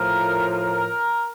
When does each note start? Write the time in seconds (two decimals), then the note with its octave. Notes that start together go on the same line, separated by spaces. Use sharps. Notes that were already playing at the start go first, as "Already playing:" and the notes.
Already playing: A2 F3 A#4
0.50 A#4